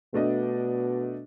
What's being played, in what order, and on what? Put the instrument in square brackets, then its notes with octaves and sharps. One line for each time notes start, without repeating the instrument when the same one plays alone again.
[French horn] B2 [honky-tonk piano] A3 D4 D#5